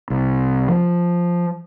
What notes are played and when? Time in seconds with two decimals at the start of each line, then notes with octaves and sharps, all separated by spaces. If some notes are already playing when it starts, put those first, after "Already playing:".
0.10 C2
0.68 F3